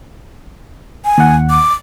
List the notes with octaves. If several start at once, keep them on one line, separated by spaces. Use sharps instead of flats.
G#5
D#2 F#5
D6